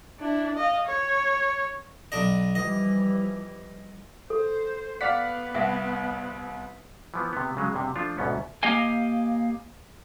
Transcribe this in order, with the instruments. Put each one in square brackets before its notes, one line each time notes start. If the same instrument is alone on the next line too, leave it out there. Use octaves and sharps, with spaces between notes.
[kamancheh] D4 E4
D#5 F5
C#5
[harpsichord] B1 D4 D#5
[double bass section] E3 F3 G3 [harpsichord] D#5
[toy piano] A4 [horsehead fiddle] C5
[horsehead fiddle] B3 B4 [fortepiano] D5 F#5 [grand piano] F5 B6
[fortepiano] C2 [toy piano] E5 F#5
[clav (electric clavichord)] E3 F3 B3
C3 B3
C#3 F#3 G#3
G2 C3
F3 A3 D4 F4
D2 G#2 B2 B3 C#4
[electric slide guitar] A#3 G4 D#5 F5 G#5